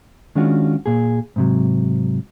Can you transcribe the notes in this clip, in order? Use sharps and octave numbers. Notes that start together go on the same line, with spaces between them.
D#3 G#3 C#4 D4 F4 F#4
A#2 G#4
G#2 C3 F#3